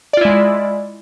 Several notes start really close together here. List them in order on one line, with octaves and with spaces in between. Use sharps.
D5 F4 E4 G#3